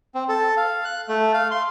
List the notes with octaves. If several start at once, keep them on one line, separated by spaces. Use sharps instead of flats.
C4
A4
F5
F#6
A3
F5
C6